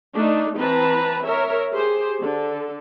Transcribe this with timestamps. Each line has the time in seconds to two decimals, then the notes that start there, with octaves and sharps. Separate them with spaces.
0.16 A3 D4 D#4
0.59 E3 C4 B4 A5 A#5
1.24 A#4 C#5 E5
1.72 G4 G#4 C5
2.21 D3 A4